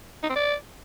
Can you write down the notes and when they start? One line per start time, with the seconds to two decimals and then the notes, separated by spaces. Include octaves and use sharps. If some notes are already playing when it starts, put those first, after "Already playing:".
0.23 D#4
0.29 C4
0.36 D5